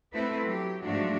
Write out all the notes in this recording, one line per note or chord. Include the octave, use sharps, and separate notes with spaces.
A3 B3 C4 E4 A4 B4
F#3 G4
G#2 F3 F#3 A3 D4 F#4